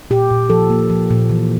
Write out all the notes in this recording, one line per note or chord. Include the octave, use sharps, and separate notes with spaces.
A#2 G4
A#2
F3 A4
A#3
F3
A#2
E3